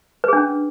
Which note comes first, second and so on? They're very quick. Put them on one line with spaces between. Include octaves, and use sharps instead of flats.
B4 G#4 D4 C#4